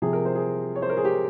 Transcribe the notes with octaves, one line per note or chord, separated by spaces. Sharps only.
C3 F3 G#4
A#4
C5
G#4
C#5
C5
A#4
G#4
G4